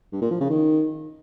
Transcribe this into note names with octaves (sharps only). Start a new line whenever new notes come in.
G2
A#2
F3
C#3
D#3